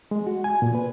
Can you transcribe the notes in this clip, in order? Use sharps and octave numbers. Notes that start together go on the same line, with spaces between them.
G#3
F#4
G#5
A#2
B4